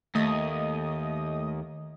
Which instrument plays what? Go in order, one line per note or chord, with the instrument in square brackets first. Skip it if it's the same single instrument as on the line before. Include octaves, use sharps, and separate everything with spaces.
[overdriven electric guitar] D#2 [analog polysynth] A3 D#5 D#6